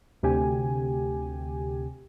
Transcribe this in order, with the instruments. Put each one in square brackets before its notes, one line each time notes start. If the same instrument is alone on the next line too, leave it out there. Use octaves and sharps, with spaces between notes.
[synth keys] D2 C3 G4 G#5